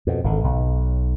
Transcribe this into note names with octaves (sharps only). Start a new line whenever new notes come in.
F2 B2
G#1 D3
B1